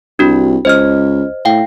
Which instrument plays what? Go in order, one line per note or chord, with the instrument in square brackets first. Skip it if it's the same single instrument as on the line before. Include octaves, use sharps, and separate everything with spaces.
[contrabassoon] C2 [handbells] D4 F#4
[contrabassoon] C#2 [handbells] C5 D#5 F6
[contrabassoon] A2 [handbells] F5 G5